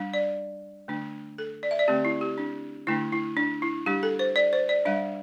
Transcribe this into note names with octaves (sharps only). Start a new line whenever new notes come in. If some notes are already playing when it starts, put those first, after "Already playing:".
Already playing: G3 D4
D5
D3 A3 D4
A4
D5
E5
D5
D3 A3 C4 G4
E4
G4
D4
D3 A3 D4 E4
E4
D4
E4
G3 D4 G4
A4
C5
D5
C5
D5
G3 D4 E5